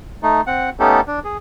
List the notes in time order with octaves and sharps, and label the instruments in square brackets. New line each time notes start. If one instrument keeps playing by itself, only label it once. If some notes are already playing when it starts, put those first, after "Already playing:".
[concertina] A3 D#4
C4 F#5
A3 B3 C#4 D#4 G4 A4
D4
G#4